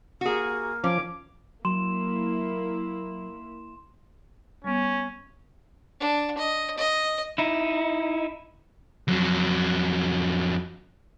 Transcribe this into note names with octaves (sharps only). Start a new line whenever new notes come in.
A#3 F#4 G#4
F3 C#4 D6
F#3 A#3 E4 C6 E7
G3 B3 C#4
D4
D#5
D#5
D#4 E4
F2 F#3